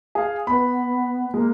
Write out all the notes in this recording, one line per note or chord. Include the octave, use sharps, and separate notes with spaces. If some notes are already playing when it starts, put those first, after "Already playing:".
G#4 F5
B3 B4 B5
G#3 A#3